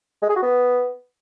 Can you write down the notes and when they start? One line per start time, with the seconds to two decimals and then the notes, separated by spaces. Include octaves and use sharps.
0.22 G#3
0.29 G#4
0.36 F#4
0.43 B3